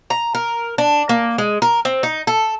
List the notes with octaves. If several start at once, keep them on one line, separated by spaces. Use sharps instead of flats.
A#5
A#4
D4
A#3
G#3
A#4
C4
D#4
A4